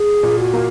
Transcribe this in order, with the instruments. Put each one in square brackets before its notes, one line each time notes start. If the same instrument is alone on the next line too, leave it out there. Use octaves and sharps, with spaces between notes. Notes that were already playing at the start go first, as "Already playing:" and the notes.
Already playing: [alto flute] G#4
[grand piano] A#2
[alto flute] F#4
[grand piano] A#3